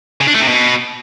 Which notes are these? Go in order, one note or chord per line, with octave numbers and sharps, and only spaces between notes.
C#3
D4
A3
C3
B2